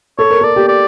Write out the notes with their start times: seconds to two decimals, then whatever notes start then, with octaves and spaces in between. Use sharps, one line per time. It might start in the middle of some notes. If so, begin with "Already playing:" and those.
0.19 A4 C#5
0.30 A#4
0.41 A4
0.44 D5
0.56 G4
0.69 D5